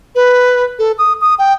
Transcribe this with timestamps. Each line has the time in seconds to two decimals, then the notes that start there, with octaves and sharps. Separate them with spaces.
0.15 B4
0.79 A4
0.98 D#6
1.21 D#6
1.39 G5